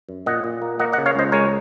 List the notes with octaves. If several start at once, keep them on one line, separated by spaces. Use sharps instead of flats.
F#2
A#2 D#5 F#5
A#2
A#3
A#3 D#5 F#5
D#5 F#5
C#3
C#5 F5
C#2 C5 D#5
G#3 A#4 C#5